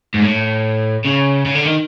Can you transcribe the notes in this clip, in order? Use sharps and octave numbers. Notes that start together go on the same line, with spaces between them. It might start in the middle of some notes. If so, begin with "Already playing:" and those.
G#2
A2
C#3
C#3
D3
D#3